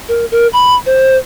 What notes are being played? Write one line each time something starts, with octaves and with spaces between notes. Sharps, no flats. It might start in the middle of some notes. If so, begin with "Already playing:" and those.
A#4
A#4
B5
C5